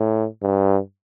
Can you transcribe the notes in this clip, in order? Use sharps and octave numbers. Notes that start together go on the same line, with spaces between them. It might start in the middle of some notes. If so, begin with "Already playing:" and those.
Already playing: A2
G2